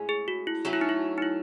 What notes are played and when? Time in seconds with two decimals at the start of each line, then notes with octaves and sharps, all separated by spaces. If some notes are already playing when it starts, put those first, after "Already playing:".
Already playing: A2 G#3 C#4
0.09 G#4
0.28 F#4
0.47 E4
0.65 F#3 A3 C#4 F#4
0.73 E4
0.81 D#4
0.89 E4
1.18 D#4
1.22 E4